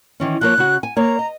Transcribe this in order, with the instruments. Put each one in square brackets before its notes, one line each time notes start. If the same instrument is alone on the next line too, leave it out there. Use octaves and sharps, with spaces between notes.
[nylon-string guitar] D#3 E3 C#4
[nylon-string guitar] F3 A#3 C#5 [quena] F#6
[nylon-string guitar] C#3 F#4
G#5
[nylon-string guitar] A#3 C#5 [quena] A#5
[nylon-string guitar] D#5